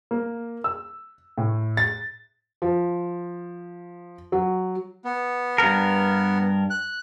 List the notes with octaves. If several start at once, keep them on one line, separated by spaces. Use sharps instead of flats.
A#3
E6
A2
A6
F3
F#3
B3
G2 A#4
F#6